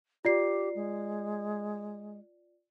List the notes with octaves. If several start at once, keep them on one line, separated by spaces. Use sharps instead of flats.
F4 G4 D5 C7
G#3